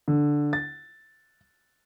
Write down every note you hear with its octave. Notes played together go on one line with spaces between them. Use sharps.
D3
A6